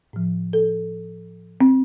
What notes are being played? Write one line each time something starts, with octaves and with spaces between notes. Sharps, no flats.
A2 F3
A4
C4